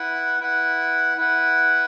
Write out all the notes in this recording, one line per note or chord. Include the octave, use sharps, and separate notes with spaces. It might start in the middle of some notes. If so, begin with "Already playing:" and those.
Already playing: E4 B4 F#5
E4 B4 F#5
E4 B4 F#5